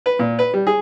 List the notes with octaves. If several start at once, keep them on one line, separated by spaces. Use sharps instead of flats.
B4
A#2
B4
G3
G#4